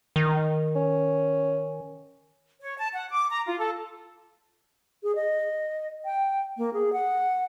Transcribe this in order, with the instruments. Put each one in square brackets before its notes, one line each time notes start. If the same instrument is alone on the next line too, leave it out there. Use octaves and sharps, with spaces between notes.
[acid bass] D#3
[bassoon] C#4
[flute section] C#5
A5
F#5
D6
A#5
F4
A4
[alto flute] G#4
D#5
G5
A#3
G#4
F#5